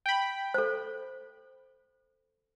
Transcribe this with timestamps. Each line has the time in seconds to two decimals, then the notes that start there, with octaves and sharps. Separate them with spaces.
0.06 G5 B5
0.54 A4 C5